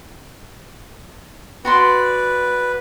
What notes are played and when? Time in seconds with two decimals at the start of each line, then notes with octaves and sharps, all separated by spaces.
1.65 F#4 B4 D5 C6